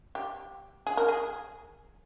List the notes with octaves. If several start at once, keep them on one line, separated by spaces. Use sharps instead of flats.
G4
G#4
A#4
G#4